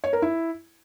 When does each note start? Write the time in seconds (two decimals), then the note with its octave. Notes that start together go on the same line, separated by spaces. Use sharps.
0.04 C#5
0.13 A#4
0.22 E4